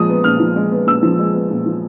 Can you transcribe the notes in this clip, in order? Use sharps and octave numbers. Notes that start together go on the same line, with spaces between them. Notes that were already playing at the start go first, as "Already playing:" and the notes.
Already playing: A#2 F3 G#3 D#6
B3
A#2 F6
F3
G#3
B3
A#2 E6
F3
G#3
B3
A#2
F3